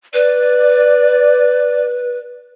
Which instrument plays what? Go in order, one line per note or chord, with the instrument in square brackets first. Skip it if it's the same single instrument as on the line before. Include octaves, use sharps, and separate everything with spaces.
[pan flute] B4 [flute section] D5